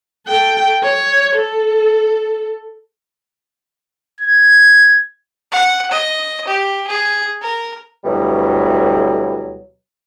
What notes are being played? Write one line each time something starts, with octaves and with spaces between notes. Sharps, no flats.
A4 G5
C#5
A4
G#6
F#5
D#5
G4
G#4
A#4
D2 B2 E3 F#3 G3